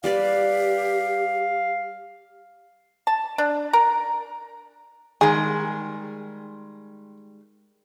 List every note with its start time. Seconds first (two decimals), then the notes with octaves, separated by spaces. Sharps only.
0.04 G3 G4 B4 D5 F5
3.07 A5
3.38 D4
3.73 A#4
5.21 D#3 G3 G#3 G#4